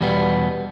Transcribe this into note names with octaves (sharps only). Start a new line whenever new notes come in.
E2 B2 G3 B3